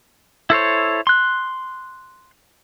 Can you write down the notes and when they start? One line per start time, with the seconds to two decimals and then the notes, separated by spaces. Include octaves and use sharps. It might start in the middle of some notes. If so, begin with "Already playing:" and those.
0.50 E4 A4 C5 C#5
1.07 C6 F#6